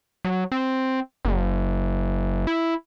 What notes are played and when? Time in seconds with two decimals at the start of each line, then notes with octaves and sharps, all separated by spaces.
0.25 F#3
0.52 C4
1.25 F#1
2.47 E4